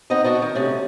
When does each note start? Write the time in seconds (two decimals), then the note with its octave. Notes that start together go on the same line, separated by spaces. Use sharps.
0.10 B3 C4 D#4 D#5
0.24 B3 D4 F#4
0.42 D#3
0.55 C3 A3 C#4